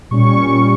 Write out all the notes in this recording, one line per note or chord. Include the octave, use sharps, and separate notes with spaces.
A#2 G3 C#4 C#6